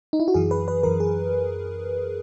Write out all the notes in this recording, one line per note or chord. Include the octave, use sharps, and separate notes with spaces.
D#4
E4
F#4
F#2 E3 G#4
B4
B4
F#2 E3 A#4
G#4